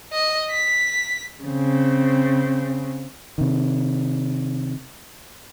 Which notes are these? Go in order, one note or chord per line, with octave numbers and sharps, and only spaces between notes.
D#5
B6
C#3 C4
C3 D#3